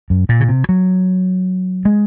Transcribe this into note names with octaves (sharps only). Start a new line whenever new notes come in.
F#2
A#2
C#3
C3
F#3
G#3